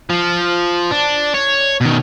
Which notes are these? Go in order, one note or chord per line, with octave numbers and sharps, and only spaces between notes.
F3
D4
C#5
B2 D#3